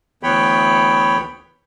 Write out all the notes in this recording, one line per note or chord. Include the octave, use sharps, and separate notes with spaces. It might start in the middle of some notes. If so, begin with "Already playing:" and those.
D2 E3 B3 C#5 G5 B5